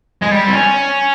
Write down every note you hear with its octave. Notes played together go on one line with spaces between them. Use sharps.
G#3
G3
C4
C#4